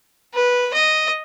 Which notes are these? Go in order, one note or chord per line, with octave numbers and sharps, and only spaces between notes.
B4
D#5